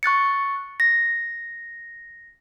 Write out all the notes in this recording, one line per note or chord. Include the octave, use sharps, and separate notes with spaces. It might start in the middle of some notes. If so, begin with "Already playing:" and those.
C#6 F#6 A6 C#7
A#6